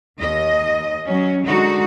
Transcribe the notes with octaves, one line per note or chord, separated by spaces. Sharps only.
D#2 D#5
F#3 C#4
D3 G#3 D#4 F#4